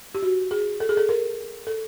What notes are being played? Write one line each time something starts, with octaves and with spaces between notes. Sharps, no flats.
G4
F#4
G#4
A4
G#4
A4
A#4
A4